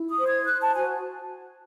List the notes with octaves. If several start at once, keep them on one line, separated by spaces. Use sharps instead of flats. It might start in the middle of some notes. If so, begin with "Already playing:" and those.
Already playing: E4
D#6
C5
G#6
C5 F#6
A5
F#4 G#5